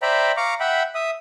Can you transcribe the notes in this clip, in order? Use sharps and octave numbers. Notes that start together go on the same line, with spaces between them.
C5 D5 E5 G5 A#5 B5
F5 A#5 C#6 D6
E5 F#5 G5 B5
E5 D#6